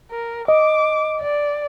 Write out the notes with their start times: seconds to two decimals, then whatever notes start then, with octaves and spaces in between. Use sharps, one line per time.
0.11 A#4
0.48 D#5 D6
1.21 D5